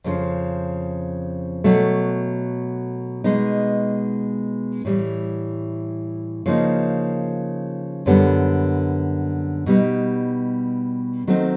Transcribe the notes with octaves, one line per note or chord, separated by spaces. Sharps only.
F2 C#3 F3
B2 F#3 A3
B2 G#3 B3 D#4
A2 E3 G3
C#3 F3 A#3 D#4
F#2 D3 G3 B3
B2 G3 B3 D#4
D#3 F#3 A3 C4 D#4